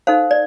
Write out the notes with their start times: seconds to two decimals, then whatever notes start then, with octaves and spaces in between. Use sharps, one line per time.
0.07 D#4 A4 C5 F5
0.31 D5